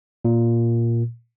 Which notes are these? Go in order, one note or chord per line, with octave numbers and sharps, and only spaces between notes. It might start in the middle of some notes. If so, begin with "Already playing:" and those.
A#2